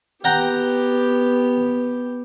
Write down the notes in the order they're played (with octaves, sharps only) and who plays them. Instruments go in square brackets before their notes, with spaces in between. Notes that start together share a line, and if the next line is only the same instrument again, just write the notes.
[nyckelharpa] B3 G4 [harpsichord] F#5 G5 A#5